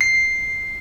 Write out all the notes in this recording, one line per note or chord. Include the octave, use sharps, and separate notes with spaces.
C7